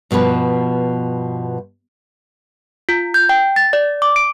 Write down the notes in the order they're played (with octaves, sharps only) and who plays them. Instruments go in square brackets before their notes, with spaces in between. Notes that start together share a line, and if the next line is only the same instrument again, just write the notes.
[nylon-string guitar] G2 B2 F3 B4
[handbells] F4
G6
G5
A6
D5
D6
D7